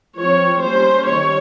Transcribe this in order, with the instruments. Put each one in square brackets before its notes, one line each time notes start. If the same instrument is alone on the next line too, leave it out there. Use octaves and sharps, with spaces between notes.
[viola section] F3 C4 C#5
G3 A#3 C#4 C5
D#3 G3 C#5